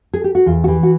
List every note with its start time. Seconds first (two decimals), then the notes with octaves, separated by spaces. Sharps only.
0.14 G#4
0.24 G4
0.35 F#4
0.46 E2 F4
0.64 F#4
0.68 E3 G4
0.83 F#4